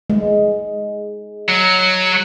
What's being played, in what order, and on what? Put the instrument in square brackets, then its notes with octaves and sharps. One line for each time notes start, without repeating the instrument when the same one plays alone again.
[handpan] G#3
[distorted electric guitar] F#3